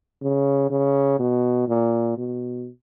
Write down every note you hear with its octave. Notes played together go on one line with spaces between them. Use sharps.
C#3
C#3
B2
A#2
B2